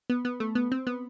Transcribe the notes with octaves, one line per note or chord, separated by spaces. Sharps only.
B3
B3
A3
B3
C4
B3